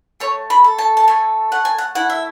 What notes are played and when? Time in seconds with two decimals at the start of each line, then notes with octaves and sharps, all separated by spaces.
0.20 A3 C#5
0.50 B5
0.64 A4
0.78 A5
0.97 A5
1.08 A3 G#5
1.52 A3 F#5
1.65 G#5
1.78 F#5
1.95 E4 F#5
2.10 E5